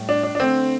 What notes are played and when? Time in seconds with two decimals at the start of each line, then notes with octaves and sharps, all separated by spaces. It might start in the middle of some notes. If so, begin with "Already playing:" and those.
Already playing: A2 G3
0.09 D4
0.23 D4
0.35 D4
0.40 D3 A3 C4